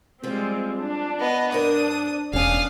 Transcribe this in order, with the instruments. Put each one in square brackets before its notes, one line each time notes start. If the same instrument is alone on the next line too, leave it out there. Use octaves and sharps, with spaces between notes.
[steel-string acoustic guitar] F3 F4 [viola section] G3 G#3 C4
[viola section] D4
[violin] B3 D#5
[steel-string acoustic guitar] G2 C4 A#4 [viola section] D4 [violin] D#6
[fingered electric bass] E1 C#4 [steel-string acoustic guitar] E3 B3 [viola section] D4 [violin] F5 D#6